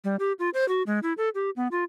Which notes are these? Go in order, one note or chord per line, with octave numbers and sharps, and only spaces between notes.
G3
G4
F4
C5
F#4
G#3
E4
A4
G4
B3
F4